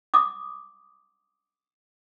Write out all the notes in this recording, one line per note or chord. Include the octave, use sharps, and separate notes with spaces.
D6 D#6